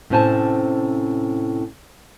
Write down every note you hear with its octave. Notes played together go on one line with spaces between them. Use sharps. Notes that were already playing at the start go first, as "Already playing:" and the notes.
A2 C3 C#4 C5 G#5 A5